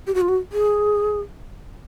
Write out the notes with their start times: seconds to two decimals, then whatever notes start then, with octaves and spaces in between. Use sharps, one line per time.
0.07 G4
0.15 F#4
0.21 F4
0.29 F#4
0.52 G#4